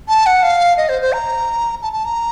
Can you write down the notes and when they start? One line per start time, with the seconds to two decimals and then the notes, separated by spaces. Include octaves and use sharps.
0.08 A5
0.26 F#5
0.43 F5
0.77 D#5
0.89 C5
1.02 C5
1.13 A#5
1.82 A5
1.93 A5
2.05 A#5